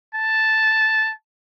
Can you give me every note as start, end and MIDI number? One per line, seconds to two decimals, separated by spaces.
0.15 1.12 81